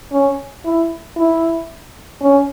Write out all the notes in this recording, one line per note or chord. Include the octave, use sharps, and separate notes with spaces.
C#4
E4
E4
C#4